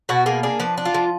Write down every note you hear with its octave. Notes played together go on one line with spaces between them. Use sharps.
B2 F#4
A#3 G#4
D4 G#4
F3 B4
D4
F4
F3